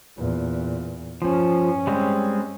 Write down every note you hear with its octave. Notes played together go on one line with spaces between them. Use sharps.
E2 A#2
G2 F3 C#4
G3 G#3 C4